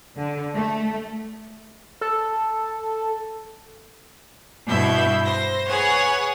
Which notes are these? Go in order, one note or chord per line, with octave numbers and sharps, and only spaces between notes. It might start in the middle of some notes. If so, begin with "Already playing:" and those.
D3
A3
A4
G2 B2 E4 E5 B5 G6
C5 A#6
G#4 B4 C#5 F#5 G#5